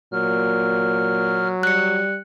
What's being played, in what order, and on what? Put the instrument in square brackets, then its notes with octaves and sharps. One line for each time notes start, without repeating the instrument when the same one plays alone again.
[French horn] A#2 [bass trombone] F#3 [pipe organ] F6
[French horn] G3 [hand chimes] F#6 C#7